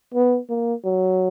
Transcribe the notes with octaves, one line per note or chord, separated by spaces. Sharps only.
B3
A#3
F#3